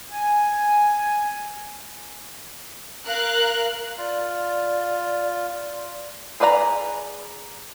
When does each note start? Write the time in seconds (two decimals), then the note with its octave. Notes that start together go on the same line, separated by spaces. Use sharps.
0.11 G#5
3.06 A#4 F5 F#6
3.98 F4 D5
6.40 G#4 B4 D5 F5 A#5